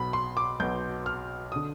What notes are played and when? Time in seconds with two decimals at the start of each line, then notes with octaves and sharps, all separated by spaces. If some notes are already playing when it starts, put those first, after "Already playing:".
Already playing: B1 B2 B5
0.13 C6
0.37 D6
0.60 B1 B2 G6
1.06 F6
1.52 D3 D#6